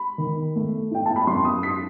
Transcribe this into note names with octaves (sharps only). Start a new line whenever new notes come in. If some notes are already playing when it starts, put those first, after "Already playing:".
Already playing: B5
D#3
A3
E4 G5
A5
B5
F#2 C6
D#6
D#4 B6